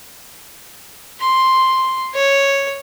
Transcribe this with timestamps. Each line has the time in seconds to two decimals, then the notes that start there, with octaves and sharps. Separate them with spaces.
1.20 C6
2.15 C#5